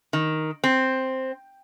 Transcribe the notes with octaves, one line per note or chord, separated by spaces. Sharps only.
D#3
C4